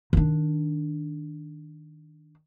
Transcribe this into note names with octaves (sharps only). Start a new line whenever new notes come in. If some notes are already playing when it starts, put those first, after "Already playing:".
D#3 D4